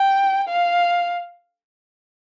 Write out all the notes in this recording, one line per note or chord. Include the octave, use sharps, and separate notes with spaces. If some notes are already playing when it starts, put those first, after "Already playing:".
Already playing: G5
F5